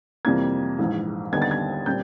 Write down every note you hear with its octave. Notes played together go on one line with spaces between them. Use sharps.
F2 C3 E3 G3 A#3 G#6
A#1 G#2 E3
D#2 D3 G3 B3 D#4 G#6
A6
G#6
A#2 G3 C4 G6